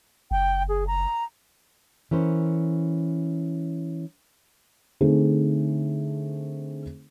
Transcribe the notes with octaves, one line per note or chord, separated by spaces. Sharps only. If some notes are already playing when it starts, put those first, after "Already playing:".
F#1 G5
G#4
A#5
E3 C#4 A#4 C5
D3 A3 C4 D#4 G#4 C5